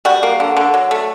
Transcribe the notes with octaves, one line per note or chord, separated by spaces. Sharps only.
G3 F#4
A#3
D3
D3
F#3
A3